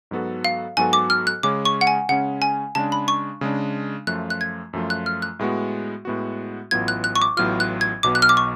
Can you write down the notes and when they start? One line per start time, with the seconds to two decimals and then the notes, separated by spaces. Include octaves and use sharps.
0.11 G#2 F#3 B3 F#4 A4
0.45 F5
0.77 G#2 F#3 B3 F#4 A4 G#5
0.93 D6
1.10 F6
1.27 F#6
1.43 C#3 G#3 C#4 D6
1.65 C#6
1.81 F#5
1.87 G#5
2.09 C#3 G#3 C#4 F#5
2.42 G#5
2.75 C#3 G#3 D4 A5
2.92 B5
3.08 C#6
3.41 C#3 G#3 D4
4.07 F#2 F3 A3 F4 F#6
4.30 F#6
4.41 G#6
4.73 F#2 F3 A3 F4
4.90 F#6
5.06 F6
5.22 F#6
5.39 A2 G#3 B3 F#4
6.05 A2 G#3 B3 F#4
6.71 A1 A2 F#3 B3 F4 G#6
6.88 F#6
7.04 F#6
7.16 C#6
7.22 D6
7.37 A1 A2 F#3 B3 F4 F6
7.60 F#6
7.81 G#6
8.03 B1 B2 F#3 B3 D6
8.15 F#6
8.22 F6
8.29 D6
8.37 C#6